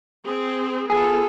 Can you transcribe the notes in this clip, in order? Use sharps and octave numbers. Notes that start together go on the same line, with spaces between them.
C4 G#4
B3 F4 G#4 A4